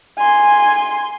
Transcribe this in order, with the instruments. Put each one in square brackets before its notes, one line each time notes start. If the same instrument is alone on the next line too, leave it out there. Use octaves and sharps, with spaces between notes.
[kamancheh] G#5 C6